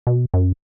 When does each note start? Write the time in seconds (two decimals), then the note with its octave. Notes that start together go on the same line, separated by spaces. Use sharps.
0.07 B2
0.34 F#2